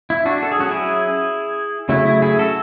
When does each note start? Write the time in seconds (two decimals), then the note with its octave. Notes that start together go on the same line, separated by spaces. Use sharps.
0.10 E4
0.25 D4 F#4
0.42 A4
0.52 G#4
0.59 F#3 C#4 F#4
0.69 E4 G#4
1.89 C#3 F#3 A3 E4
2.05 E4
2.22 E4 G#4
2.39 F#4 A4